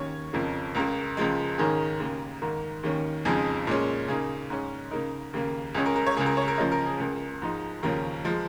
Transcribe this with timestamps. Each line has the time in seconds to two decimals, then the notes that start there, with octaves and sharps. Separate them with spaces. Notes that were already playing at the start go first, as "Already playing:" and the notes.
Already playing: D#2 D#3 C#4 C#5
0.33 F2 C#3 F3 A#3
0.75 C#2 C#3 A#3 A#4
1.17 C#2 C#3 F3 G#3
1.58 G#2 D#3 A#3 C#4 G#4
2.00 D#2 C#3 A#3
2.42 G#2 D#3 A#3
2.83 D#2 D#3 C#4
3.25 F2 C#3 F3 G#3 D#4 G#4
3.67 A#2 G#3 C#4
4.08 C#3 A#3 D#4 G#4
4.50 G#2 G#3 C#4
4.91 C#3 A#3 D#4 A#4
5.34 D#2 C#3 A#3
5.75 C#2 C#3 G#3 C#4 G#4
5.86 A#4
5.96 A#4
6.07 C#5
6.17 C#2 C#3 A#3 G#4
6.26 A#4
6.37 C#5
6.48 A#4
6.58 C#3 F3 A#3 C#4 D#5
6.72 A#4
6.86 G#4
7.00 C#2 C#3 A#3
7.42 G#2 F3 G#3 D#4
7.83 D#2 C#3 F3 C#4 A#4
8.24 F3 G#3